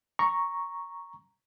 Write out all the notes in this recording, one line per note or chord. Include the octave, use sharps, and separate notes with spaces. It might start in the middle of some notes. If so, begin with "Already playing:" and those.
A#5 C#6